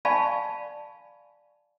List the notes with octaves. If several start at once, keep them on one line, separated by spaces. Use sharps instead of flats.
D5 F5 G#5 A5 B5 C#6